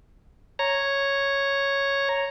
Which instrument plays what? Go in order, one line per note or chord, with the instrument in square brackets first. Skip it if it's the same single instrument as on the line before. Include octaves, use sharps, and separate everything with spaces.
[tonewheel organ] C#5 A#5